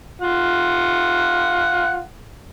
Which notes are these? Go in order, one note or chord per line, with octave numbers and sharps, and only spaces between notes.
F4 F#5